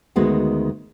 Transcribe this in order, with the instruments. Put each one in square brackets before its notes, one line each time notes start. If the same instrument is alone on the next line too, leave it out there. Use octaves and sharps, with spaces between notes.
[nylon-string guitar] D2 D#3 G#3 B3 F#4